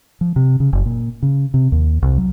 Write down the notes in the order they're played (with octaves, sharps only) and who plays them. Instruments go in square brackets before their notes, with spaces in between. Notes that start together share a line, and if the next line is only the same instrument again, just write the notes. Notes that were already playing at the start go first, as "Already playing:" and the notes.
[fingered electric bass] F3
C3
C#3
F#1
A#2
C#3
C3
D#2
C2
F#3